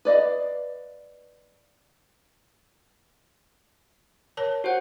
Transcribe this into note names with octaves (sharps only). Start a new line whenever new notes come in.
B4 D5 D#5 F5
A#4 C#5 A5
F#4 C5 F#5